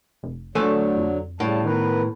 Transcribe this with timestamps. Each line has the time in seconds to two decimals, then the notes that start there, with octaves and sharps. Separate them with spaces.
0.23 F1
0.55 D3 F3 F#3 A3 A4 G#5
0.97 F2
1.40 A2 C#3 G3 A5
1.64 D#3 B3 A#4 B4